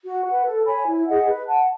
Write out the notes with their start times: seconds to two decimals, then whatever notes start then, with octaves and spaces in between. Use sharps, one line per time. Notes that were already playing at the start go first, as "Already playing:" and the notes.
0.06 F#4
0.25 B4 F#5
0.45 A4
0.65 C#5 G#5 B5
0.87 E4
1.07 G#4 D#5 F#5
1.27 B4
1.47 F#5 A5